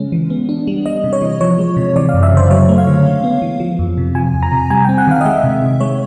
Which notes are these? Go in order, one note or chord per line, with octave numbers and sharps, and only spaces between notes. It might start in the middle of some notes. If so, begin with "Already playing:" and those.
Already playing: C#3 G#3 C#4
E3
B3
D4
G3
G3 D#5
C3
C#5
E3
F3 C#5
G#3
C3
E3 D5
F5
F#2
E5
C#3 C5
F#3 C#5
A3
F5
D3
G#3
B3
E3
F3
F2
C3
F3 G#5
E2
A#5
C3
G3 G#5
C4 G5
F#5
D#3 F5
D#5
G#3 E5
C3
D#3
G#3 C#5